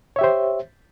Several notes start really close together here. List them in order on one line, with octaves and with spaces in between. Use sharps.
C#5 E5 G4 C5